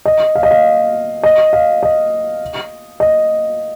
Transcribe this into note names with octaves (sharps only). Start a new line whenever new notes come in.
D#5
F5
D#5
F5
D#5
F5
D#5
D#5